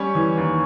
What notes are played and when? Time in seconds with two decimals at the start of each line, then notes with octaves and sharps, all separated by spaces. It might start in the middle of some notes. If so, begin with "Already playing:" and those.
Already playing: G3 C#4 C#5
0.15 E3
0.37 D#2